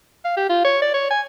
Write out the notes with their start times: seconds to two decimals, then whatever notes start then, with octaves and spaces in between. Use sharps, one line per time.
0.25 F5
0.36 G4
0.49 F4
0.64 C#5
0.82 D5
0.94 C#5
1.10 G#5